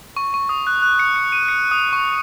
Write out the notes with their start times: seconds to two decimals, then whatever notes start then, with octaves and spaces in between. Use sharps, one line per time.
0.17 C#6
0.34 C#6
0.49 D#6
0.67 F#6
0.82 F#6
0.99 C#7
1.16 C#7
1.32 D#7
1.48 C#7
1.71 D#6
1.93 C#6